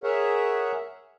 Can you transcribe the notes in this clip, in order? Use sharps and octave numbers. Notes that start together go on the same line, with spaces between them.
G#4 A#4 C#5 E5 F#5